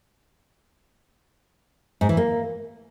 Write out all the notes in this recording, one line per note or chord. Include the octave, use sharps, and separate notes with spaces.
G#2
E3
A#3